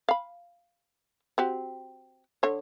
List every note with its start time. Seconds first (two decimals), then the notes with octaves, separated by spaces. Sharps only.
0.09 F5 B5
1.38 C4 F#4 G4
2.43 D3 C#5